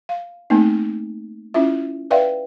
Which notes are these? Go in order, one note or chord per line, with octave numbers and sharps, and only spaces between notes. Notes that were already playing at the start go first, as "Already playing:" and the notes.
F5
A3 A#3 C4 D#4
C#4 E4 F4 E5
B4 D5 E5 F5 G5